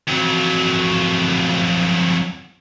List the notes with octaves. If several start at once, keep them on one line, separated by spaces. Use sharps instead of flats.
F2 F#3